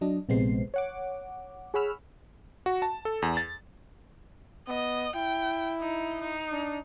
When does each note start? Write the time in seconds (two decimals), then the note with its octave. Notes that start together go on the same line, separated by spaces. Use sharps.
0.01 F#3 D4 D#5
0.29 A#1 C3 G#3 B3 C5 C7
0.74 C#5 F#5 D6
1.74 G#4 C#5 F#5 B5 E6 F6
2.66 F#4
2.82 A5
3.05 A4
3.22 E2
3.37 A6
4.68 B3 D#5
5.15 E4 G5
5.82 D#4
6.21 D#4
6.52 D4